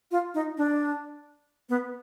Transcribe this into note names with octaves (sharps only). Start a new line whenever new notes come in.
F4
D#4
D4
B3